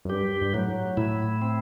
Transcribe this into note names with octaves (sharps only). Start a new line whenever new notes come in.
F#2
G2 G4
G2
A2 F#3
A2 E4
C4